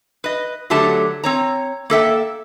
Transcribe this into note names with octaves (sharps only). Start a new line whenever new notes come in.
B4 D#5
D3 F#3 A3 G4 A5
C4 C#5 A#5
A#3 A4 E5 G5